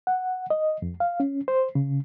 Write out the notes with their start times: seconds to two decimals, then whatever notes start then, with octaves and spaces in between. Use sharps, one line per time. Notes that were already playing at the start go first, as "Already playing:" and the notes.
0.07 F#5
0.50 D#5
0.82 F2
1.00 F5
1.20 C#4
1.48 C5
1.75 C#3